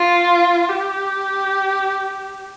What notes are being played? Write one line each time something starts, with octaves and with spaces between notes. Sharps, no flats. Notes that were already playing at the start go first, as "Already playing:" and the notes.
Already playing: F4
G4